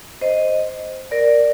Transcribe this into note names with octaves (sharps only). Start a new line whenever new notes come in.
C5 D#5
A#4 D5